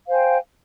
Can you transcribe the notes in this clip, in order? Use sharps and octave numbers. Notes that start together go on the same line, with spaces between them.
C5 F5 G5 G#5